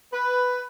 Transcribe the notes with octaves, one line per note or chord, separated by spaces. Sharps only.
B4